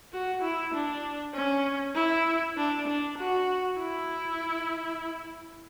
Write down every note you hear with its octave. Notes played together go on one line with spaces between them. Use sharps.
F#4
E4
D4
C#4
E4
D4
D4
F#4
E4